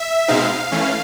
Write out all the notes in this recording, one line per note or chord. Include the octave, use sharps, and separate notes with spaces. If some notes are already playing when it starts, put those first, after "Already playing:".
Already playing: E5
B2 G#3 C4 D#4 F5
E3 A3 C#4